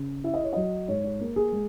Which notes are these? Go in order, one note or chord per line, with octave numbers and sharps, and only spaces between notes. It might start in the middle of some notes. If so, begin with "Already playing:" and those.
Already playing: C#3
E4 E5
D#5
C#5
F#3 D#5
G#2 C#5
C#5
A#3
G#4
G#3